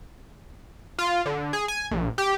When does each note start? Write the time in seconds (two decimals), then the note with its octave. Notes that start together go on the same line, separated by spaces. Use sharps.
0.99 F4
1.26 D3
1.53 G#4
1.68 G#5
1.91 A#1
2.18 G4